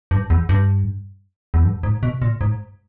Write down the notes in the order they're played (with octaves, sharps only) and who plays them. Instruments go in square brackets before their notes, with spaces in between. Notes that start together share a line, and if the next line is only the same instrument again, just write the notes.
[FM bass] G2
E2
G2
E2
G2
G#2
B2
A#2
G#2